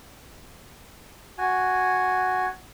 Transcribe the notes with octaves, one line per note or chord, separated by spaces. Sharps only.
F#4 G#5